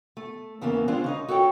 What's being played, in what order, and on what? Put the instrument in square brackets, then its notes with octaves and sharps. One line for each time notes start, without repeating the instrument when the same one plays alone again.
[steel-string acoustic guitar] A3
E2 C#3 E3 A#3 B3
D#3 G#3 C4 D4 F4 C5
C#3 D#4 D#5
F#4 A4 C#5 G5